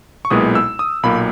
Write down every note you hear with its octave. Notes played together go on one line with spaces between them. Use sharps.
C#6
B1 A#2 G#3 B3 E4 D#6
E6
D#6
B1 A#2 A#3 B5